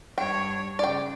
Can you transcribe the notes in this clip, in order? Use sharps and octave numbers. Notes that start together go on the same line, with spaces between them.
G2 C#5 G5
C#3 D5 G5